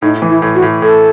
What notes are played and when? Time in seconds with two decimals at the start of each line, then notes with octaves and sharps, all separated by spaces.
0.02 A2 D#4
0.22 E3
0.29 E4
0.42 A2
0.55 F#4
0.62 A2
0.82 A2 A4